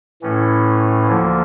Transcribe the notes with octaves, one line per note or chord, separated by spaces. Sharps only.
A2 E3 A3 C#4
D2 D3 F3 A#3